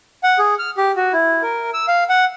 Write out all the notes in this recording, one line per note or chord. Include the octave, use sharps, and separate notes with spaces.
F#5
G#4
F6
G4
F#4
E4
A#4
E6
F5
F#5